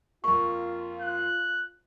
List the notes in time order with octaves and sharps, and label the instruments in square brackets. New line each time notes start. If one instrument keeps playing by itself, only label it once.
[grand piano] F2 A#3 [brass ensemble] F4 [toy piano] C#6
[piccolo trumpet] F#6